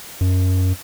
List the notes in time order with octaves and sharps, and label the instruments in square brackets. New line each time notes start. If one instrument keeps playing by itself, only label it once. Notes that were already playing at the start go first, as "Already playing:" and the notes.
[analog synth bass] F#2